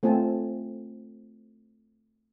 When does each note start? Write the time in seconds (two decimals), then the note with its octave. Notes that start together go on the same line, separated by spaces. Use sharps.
0.03 A3 C4 F4 G#5 A5